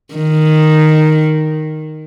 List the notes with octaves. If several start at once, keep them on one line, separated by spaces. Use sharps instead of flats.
D#3